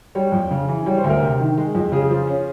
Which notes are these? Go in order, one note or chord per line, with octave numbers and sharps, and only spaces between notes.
G3 C#5
F2
C#3
E3
G3 C#5
C5
D2
A#4
C3
D#3
G#3
F2
C#3 G#4
F3
C#4